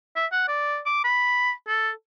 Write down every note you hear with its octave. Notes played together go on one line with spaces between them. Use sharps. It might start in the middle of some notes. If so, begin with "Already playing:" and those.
E5
F#5
D5
D6
B5
A4